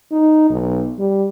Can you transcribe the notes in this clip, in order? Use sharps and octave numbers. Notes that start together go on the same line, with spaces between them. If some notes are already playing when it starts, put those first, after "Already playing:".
D#4
B1
G3